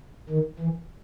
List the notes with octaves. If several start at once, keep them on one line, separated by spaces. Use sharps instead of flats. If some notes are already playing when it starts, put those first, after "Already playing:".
D#3
E3